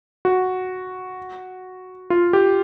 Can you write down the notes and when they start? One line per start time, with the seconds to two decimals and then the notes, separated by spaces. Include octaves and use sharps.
0.25 F#4
2.10 F4
2.33 G4